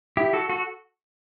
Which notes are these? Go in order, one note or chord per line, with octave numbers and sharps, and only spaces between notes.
E4 G4
F#4 A4
F#4 A4